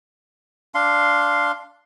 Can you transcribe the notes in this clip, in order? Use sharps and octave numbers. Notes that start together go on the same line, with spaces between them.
D4 F5 C6